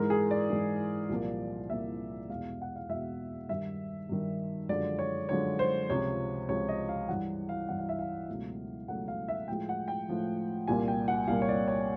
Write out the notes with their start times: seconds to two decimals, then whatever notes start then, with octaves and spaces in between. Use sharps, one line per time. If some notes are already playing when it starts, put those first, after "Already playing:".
Already playing: G#2 E3 G#3 A#4
0.10 G#4
0.31 D5
0.50 G#2 E3 G#3
1.10 C2 A#2 F3 A#3
1.70 C2 A#2 F3 A#3 E5
2.29 E2 B2 G#3 F5
2.61 F#5
2.76 F5
2.89 E2 B2 G#3 E5
3.49 G2 D#3 G3 E5
4.09 G2 D#3 G3
4.69 F#2 D3 F3 G#3 D5
4.99 C#5
5.29 F#2 D3 F3 G#3 C#5
5.59 C5
5.89 C#2 C3 F3 C#5
6.49 C#2 C3 F3 C#5
6.69 D#5
6.89 F5
7.08 G2 E3 G3 F#5
7.49 F5
7.69 G2 E3 G3 F#5
7.79 F5
7.89 E5
7.99 F5
8.29 C#2 B2 F#3 A3
8.88 C#2 B2 F#3 A3 F#5
9.08 F5
9.28 E5
9.48 A2 F3 G#3 G5
9.69 F#5
9.88 G5
10.09 A2 F3 G#3
10.68 C2 A#2 G3 A#3 G#5
10.88 G5
11.08 F#5
11.28 C2 A#2 G3 A#3 F5
11.42 C#5
11.49 D5
11.68 C#5